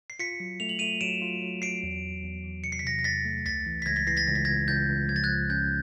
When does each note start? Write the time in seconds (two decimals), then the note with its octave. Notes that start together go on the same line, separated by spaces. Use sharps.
0.10 C7
0.19 F4 B6 C#7
0.40 F#3
0.60 A3 F7
0.69 F#7
0.79 A3 D#7 F7
1.01 F#3 D7 E7
1.22 F4
1.42 F#3
1.62 F#3 C7 D7
1.83 E2
2.03 E2
2.24 E2
2.44 E3
2.64 C3 C#7
2.72 C7
2.79 B6
2.84 C3 A#6 C7
2.99 A#6
3.04 E2 A6 B6
3.25 A3
3.45 C#2 A6 B6
3.66 E3
3.82 B6
3.86 C#2 G#6 A#6
3.96 A6 B6
4.07 E3 A#6 C7
4.17 A6 B6
4.27 C#2 A#6
4.35 B6
4.45 G#6 A#6
4.48 C#2
4.68 C#2 G6 A6
4.88 C#2
5.09 F3 G#6
5.16 A6
5.24 F#6 G#6
5.29 F3
5.50 C#4 G6